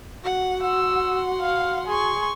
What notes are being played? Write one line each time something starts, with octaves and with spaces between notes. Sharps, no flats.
F#4 F#5
F#5 C6 E6
F5
G#4 C6 C#6